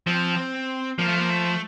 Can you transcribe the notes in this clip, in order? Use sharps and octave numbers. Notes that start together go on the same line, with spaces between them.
F3 C4
F3 A#3
A3
A#3
A3